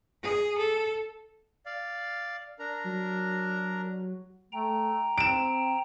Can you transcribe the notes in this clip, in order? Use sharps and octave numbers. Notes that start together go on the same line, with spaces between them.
G#4
A4
D5 F5
D4 A#4 A#5
F#3
A3 G5 A#5
C4 D7 E7